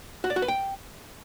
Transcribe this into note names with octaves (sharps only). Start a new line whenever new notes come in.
F#4
D5
F#4
B4
G5